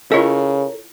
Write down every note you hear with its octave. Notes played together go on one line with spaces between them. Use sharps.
C#3 E4 F4 A4 A#4 C#5 D#5